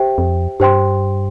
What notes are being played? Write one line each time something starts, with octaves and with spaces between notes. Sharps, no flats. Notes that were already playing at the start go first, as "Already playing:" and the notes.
Already playing: G4 C5 E5 G5
F2
G2 G4 C5 G5 C6